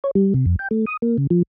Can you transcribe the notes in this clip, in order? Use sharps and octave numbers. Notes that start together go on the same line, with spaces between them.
C#5
G3
C3
F2
G5
A3
D#6
A#3
C#3
F3